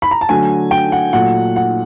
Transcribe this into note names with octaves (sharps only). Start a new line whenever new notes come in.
B5
A#5
A5
D3 F#3 A3 G#5
G5
F#5
A#2 F#3 A3 F#5
F#5